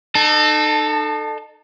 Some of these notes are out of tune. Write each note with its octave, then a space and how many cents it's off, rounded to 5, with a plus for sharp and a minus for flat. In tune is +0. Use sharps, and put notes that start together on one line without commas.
D#4 -35 A4 +0